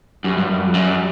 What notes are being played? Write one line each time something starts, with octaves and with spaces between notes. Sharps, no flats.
F#2 G3
G2
F#2
F2
F#2